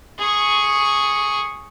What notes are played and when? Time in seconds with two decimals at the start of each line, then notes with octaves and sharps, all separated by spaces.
0.19 G#4 C#6